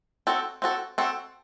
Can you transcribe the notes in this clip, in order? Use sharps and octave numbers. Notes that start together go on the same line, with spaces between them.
C4 F#4 A4
C4 F#4 A4
C4 F#4 A4